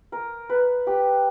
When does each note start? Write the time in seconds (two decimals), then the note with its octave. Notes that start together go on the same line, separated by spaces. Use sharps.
0.12 A#4
0.49 B4
0.87 G4